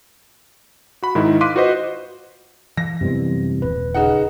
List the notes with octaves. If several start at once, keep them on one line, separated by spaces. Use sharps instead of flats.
F#4 B5
G#2 D#3 E4 D#5
F5 C6 D6 F#6 B6 D#7
F4 F#4 B4 C5 D#5
E3 A#6
F#2 C3 E3 G3 B3 C4
D#1 B4
C#3 D#4 F#5